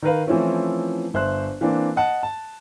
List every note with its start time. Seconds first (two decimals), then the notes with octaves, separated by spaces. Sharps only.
0.02 D#3 A#4 B4 F5
0.27 E3 F3 A3 C4 C#4 E4
1.14 G1 C5 E5 F#6
1.61 E3 A#3 C4 D4
1.96 D#5 F#5 A5
2.23 A5